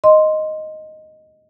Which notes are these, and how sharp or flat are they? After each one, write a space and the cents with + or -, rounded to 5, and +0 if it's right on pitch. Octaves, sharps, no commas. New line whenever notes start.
D#5 +0 C6 +0